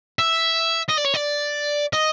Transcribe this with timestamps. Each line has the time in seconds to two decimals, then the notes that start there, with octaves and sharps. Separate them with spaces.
0.19 E5
0.89 D#5
0.98 D5
1.05 C#5
1.15 D5
1.93 D#5